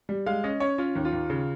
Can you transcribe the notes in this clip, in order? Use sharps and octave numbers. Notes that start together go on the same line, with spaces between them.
G3
G#3 F5
C#4 D#5
C#4 C#5
C#4 F4
D#2
F4
D#2
C#3